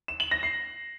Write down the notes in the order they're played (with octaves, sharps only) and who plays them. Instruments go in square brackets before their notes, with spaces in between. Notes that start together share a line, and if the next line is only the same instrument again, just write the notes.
[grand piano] E7
F#7
A#6
C7